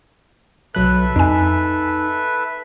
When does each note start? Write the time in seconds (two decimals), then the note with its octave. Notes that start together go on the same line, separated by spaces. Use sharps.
0.75 B1 F#3 A4 B4 E5 F#6
1.16 F2 D#4 G#5